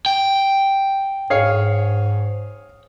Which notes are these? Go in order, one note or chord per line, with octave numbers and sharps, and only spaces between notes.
G5
G#2 G#4 C#5 F5